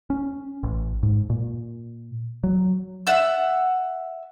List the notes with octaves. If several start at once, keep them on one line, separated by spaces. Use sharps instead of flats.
C#4
A1
G#2
A#2
F#3
E5 F#5 E6